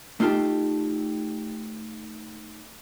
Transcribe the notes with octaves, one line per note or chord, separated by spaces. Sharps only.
A3 D#4 F4 G4 A4